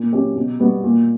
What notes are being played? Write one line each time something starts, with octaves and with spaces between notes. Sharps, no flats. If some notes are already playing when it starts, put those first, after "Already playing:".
Already playing: A#2
F#3 C#4 E4 G4
B2
G3 B3 F#4
A#2